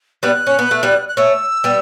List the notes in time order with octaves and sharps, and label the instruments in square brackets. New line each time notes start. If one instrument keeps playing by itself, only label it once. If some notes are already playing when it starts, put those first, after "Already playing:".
[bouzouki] G3 B3 [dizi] F#6
[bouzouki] C#4
B3
A3
G3 B3
[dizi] F#6
[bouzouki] A3 C#4 [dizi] E6
[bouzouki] G3 B3